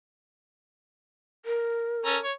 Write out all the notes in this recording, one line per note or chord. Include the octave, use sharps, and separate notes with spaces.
A#4
C#4 A4 A#5
C#5